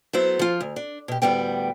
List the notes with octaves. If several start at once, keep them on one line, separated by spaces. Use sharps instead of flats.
F#3 A3 B3 E4 C5
F3 F4
D2
D4
B2 G4
D2 A2 G3 B3 G5